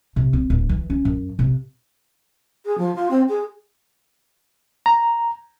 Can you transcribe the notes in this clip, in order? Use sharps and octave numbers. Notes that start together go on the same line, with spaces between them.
C3
C4
D1
E3
C#4
F#2
C3
G#4
F3
F4
C4
G#4
A#5